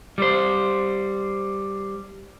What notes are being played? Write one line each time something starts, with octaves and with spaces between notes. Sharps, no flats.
G3 C5